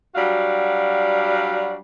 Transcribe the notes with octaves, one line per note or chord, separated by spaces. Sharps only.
F#3 G3 D4 F#4 F5